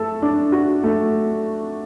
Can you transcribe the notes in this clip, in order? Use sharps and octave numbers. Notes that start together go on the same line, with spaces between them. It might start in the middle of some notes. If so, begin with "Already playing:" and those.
Already playing: A3 A4
D4
F#4
A3